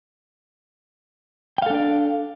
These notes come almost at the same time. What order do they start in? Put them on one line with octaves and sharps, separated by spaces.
G5 F5 A4 D4 D5